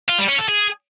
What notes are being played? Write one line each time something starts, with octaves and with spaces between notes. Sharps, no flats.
F4
G3
C#4
A4
G#4